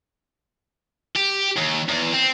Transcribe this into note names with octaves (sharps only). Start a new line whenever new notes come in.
G4
D#2
E2
C4